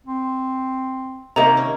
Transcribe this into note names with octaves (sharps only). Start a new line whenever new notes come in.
C4
C3 D#3 A#3 A#5
C#4